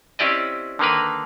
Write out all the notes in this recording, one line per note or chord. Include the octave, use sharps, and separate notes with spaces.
C4 C#4 E4 G4 D5 D#5
D3 D#3 A#3 A#4 B4